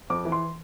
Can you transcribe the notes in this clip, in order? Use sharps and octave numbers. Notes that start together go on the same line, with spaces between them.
F2 D6
E3
C6